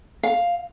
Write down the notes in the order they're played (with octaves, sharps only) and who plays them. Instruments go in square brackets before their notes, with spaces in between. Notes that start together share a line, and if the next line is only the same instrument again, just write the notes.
[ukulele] F5